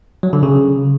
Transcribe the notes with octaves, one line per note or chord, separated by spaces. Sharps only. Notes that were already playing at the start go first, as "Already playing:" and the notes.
F#3
D3
C#3